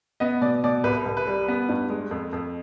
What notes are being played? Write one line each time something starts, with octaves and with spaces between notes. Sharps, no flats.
B3 D#5
B2 D5
B2 D5
C2 B4
C2
B4
G3
B3
G2
G#3
F2
F2